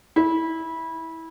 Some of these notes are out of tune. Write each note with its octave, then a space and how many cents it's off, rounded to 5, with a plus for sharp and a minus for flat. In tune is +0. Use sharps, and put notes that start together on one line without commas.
E4 -20